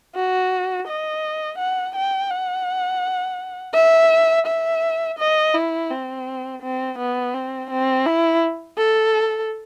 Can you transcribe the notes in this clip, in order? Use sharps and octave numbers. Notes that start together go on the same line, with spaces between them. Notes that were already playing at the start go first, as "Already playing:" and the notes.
F#4
D#5
F#5
G5
F#5
E5
E5
D#5
E4
C4
C4
B3
C4
C4
E4
A4